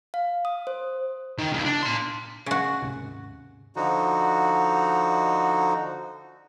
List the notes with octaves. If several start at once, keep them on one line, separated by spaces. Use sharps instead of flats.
F5
D#6
C5
D#3
C#2
D4
A#4 C6
C#3 F#4
D#2 G#2 C3
D3 F3 D#4 F#4